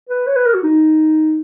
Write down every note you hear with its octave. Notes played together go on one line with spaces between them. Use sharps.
B4
C#5
B4
A#4
F#4
D#4